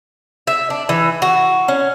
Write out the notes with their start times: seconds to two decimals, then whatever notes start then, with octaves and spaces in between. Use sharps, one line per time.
0.47 E5
0.70 D4
0.89 E3
1.22 F#4
1.68 C#4